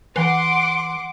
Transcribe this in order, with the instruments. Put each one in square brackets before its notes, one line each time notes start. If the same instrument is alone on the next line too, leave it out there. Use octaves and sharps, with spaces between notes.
[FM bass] E3 [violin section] F#5 C6 D6